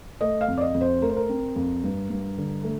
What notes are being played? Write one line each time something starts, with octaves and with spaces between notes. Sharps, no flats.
A3 D#5
F5
F2
D5
D#5
F2
C5
A3 A#4
C5
A#4
C4
F2
G2
G2
D3
A3